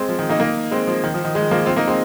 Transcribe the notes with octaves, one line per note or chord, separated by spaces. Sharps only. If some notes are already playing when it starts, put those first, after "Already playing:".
Already playing: G#3 C4
F3
D#3
A#3 D#4
A#3 D#4
G#3 C4
F3
D#3
F3
D#3
D#3 G#3
F3 A#3
C4 F4
A#3 D#4
G#3 C4